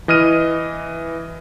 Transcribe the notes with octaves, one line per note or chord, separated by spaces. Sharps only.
E3 D#5 F6 D#7